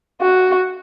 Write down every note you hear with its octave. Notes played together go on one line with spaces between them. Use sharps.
F#4